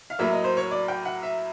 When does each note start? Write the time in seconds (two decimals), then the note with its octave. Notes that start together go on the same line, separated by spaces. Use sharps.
0.10 F5
0.19 A2 F#3 A#3 E5
0.32 D#5
0.44 C5
0.57 C#5
0.71 D5
0.88 G5
1.05 F#5
1.22 E5